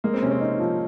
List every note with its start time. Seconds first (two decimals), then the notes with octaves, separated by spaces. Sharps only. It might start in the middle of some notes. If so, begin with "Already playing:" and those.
0.04 G#3 A#3
0.14 C4
0.22 C3 C#4
0.31 C4
0.41 D#4
0.59 F3